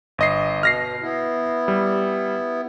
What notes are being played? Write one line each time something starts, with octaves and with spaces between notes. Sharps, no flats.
G1 D#5 C7
B2 F6 A#6 C7
B3 E4
G3